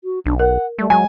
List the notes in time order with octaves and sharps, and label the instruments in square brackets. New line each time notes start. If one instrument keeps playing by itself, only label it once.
[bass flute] F#4
[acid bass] B1 [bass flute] D4
[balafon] A#4 [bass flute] F#5
[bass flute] G3 [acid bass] A3
[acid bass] F#3 [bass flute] G#3 [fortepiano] G#5